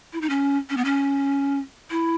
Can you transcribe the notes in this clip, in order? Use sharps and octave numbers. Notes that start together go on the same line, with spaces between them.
E4
D#4
C#4
C#4
B3
C#4
E4